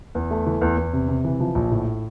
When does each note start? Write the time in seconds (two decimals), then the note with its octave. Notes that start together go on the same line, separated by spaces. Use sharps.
0.15 E2
0.31 A3
0.46 E3
0.61 E2
0.77 E2
0.93 C3
1.09 C3
1.25 E3
1.40 F3
1.55 A#1
1.71 A2